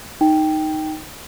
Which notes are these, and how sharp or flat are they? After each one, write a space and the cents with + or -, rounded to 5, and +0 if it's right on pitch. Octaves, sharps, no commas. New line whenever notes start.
D#4 +0 G5 +0